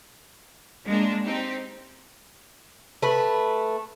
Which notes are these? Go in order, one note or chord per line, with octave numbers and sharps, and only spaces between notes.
G#3 A#3 D4
C4 D#4 G4
A3 B4